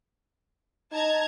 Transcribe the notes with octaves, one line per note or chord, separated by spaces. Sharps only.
D#4 A5 A#5 G#6